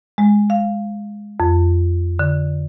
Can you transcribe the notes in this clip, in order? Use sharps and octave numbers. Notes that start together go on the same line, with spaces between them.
G#3
F5
F2
D3